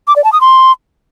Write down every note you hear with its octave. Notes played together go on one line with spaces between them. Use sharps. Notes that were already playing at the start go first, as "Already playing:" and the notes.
D6
D5
A5
D#6
C6